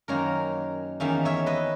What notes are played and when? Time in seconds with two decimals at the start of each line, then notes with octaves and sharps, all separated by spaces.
0.08 F#2 D#3 A#3 A#4 C#5
1.00 E2 D#3 A#3 C#4 E5
1.25 C#5 E5
1.46 B4 D#5